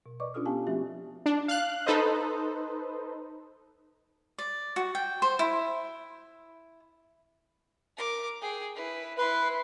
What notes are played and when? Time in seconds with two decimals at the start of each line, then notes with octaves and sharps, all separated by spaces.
0.06 B2
0.20 B4 D5 D#5 C#6 D6
0.34 C#4 D4 F4 A4 D#6 F6
0.45 B3 G4 F5 G#5 A5
0.67 F3 A3 C4 F#4 G4 E5
1.26 D4
1.48 F5 F#6
1.86 D#4 A4 B4 C5 D#5
4.38 D5
4.76 F#4
4.95 G5
5.22 C5
5.39 E4
7.97 A#4 D6
8.42 G#4 G5
8.75 E4 B4
9.18 E4 B4 C6